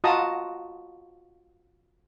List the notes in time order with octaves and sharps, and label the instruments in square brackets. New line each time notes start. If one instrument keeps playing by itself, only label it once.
[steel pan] F4 F#4 D#5 A5 A#5 D#6